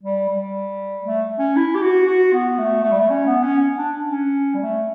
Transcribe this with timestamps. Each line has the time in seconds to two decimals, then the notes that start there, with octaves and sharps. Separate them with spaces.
0.03 G3
0.29 G3
1.05 A3
1.39 C#4
1.56 E4
1.75 G4
1.82 F#4
2.07 F#4
2.33 B3
2.58 A3
2.83 A3
2.91 G3
2.99 A3
3.09 C#4
3.26 B3
3.43 C#4
3.77 D4
4.11 C#4
4.54 G3
4.62 A3